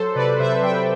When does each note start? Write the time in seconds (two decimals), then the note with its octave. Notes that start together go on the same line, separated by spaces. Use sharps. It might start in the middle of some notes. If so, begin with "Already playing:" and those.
Already playing: F#3 A4 C5
0.14 C3 B4 D5
0.38 C3 C5 E5
0.62 F#3 E5 G5